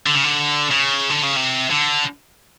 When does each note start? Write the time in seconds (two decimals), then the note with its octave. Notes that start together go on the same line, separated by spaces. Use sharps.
0.06 D3
0.15 C#3
0.24 D3
0.71 C#3
1.10 D3
1.23 C#3
1.36 C3
1.70 D3